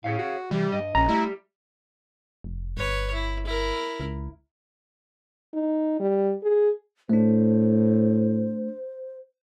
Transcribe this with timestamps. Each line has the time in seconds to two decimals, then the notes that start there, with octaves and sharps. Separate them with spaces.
0.04 A2 G#4 C#5 F5
0.18 F#4
0.51 C3 E3 G3
0.72 G2 D#5
0.95 A#1 C#4 A#5
1.09 G3 A3 E4
2.44 F1
2.77 G1 B4 C#5
3.13 E4
3.46 E4 A#4
4.00 C#2
5.53 D#4
6.00 G3
6.43 G#4
7.09 A2 A3 D4 C5